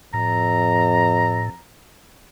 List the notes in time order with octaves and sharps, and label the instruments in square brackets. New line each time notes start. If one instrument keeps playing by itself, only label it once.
[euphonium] F2 [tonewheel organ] A2 [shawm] A#5